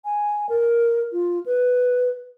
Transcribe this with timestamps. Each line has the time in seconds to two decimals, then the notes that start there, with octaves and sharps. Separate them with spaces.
0.05 G#5
0.49 A#4
1.12 F4
1.46 B4